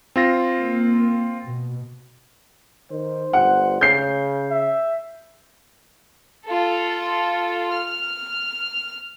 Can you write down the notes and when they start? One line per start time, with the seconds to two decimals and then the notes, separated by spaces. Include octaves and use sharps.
0.16 C4 F4 A#6
0.58 A#3
1.42 B2
2.91 D#3 C5
3.33 G1 F#5
3.81 C#3 G6 C7
4.50 E5
6.48 F4 A4
7.72 F6